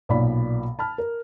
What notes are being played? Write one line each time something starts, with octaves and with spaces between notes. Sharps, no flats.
B1 A#2 D5 B5
A5 B5 F6
A#4